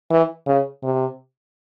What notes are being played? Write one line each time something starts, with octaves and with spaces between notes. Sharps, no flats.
E3
C#3
C3